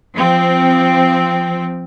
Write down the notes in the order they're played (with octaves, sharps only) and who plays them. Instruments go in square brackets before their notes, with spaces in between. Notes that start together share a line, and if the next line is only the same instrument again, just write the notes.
[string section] F3 C4